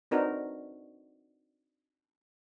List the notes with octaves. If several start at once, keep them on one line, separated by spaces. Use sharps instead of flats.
C4 D4 D#4 F#4 A#4 B4